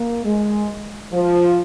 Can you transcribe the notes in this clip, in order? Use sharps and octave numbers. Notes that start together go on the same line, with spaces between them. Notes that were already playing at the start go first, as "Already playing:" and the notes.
Already playing: A#3
G#3
F3